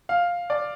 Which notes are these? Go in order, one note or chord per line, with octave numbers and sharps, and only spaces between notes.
F5
D5